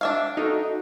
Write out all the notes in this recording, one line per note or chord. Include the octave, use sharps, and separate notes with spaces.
D4 E5 F5
D#4 F#4 A4